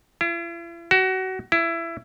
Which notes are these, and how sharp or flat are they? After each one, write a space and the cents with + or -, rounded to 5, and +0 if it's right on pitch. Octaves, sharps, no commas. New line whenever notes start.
E4 +45
F#4 +25
E4 +20